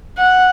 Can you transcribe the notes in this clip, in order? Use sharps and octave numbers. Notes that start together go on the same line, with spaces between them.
F#5